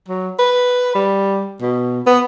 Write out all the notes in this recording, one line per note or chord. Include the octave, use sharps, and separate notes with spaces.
F#3
B4
G3
B2
B3